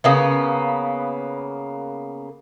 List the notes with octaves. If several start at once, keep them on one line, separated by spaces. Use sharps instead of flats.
C#3 A#3 B3